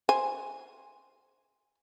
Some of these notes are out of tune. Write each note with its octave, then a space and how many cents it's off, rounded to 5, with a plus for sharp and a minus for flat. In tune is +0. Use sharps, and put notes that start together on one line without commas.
C5 +0 G#5 -10